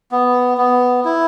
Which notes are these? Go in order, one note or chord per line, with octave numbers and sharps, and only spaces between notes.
B3
B3
E4